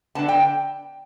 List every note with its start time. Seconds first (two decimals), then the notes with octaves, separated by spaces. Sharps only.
0.15 D3 B3 D4 A5
0.28 G5